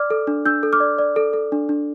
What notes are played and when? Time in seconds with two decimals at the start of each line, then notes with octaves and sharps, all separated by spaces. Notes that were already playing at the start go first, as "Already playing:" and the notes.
Already playing: D5 D6 F6
0.10 A4
0.27 D4
0.46 D4 E6 G6
0.63 A4
0.73 D6 F6
0.80 D5
0.98 D5
1.16 A4
1.33 A4
1.52 D4
1.69 D4